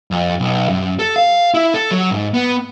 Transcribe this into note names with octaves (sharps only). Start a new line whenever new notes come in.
F2
B1
F#2
A4
F5
E4
A4
F#3
G#2
B3